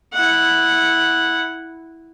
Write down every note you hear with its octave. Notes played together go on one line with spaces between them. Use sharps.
E4 F#5